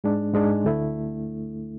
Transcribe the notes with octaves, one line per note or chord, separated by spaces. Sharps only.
G#2 G#3 D4
G#2 G#3 D4
D2 D3 A3 E4